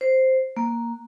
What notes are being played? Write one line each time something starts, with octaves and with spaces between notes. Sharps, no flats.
C5
A#3